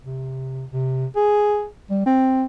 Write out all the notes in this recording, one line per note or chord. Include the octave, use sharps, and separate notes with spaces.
C3
C3
G#4
G3
C4